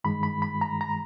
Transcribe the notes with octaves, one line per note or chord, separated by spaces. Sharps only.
G2 D#3 G#3 B5
B5
B5
A#5
A#5